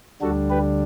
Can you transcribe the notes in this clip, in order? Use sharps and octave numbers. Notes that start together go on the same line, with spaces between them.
D2 D3 G3 D4 F#4 A4
G4 B4